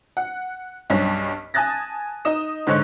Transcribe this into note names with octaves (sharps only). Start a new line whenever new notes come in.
F#5
B1 G2 C#4 B6
G#5 A5 D#6 F#6 A6 A#6
D#4 D#5 D#6 E7
G#2 D3 C5 C#5 D#5 F#6